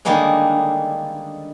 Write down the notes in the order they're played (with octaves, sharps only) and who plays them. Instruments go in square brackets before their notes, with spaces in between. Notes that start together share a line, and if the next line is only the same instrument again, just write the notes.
[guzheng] D3 D#3 G3 G#3 A#3 C#4